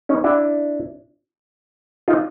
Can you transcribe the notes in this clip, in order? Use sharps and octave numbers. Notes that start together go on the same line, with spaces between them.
C#4 D#4
D4 E4
D#4 F4